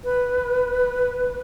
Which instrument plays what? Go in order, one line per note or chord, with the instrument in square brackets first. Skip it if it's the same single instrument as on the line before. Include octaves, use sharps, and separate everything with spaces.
[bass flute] B4